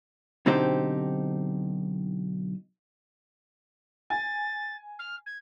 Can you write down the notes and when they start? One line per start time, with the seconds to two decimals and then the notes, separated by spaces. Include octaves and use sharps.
0.46 B1 D3 C4 D#4 G4 C5
4.10 G#5 A6
4.99 F6
5.26 G#6